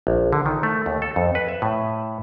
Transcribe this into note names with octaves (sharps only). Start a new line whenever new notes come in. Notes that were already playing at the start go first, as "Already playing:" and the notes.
A#1
D3
D#3
A3
D#2
A4
F2
B4
E5
A2